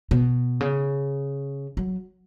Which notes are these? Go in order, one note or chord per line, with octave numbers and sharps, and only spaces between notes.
B2
C#3
F#3